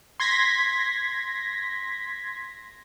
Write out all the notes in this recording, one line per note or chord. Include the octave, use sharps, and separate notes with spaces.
C6 G#6 A#6 B6